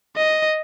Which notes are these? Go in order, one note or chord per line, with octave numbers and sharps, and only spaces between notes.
D#5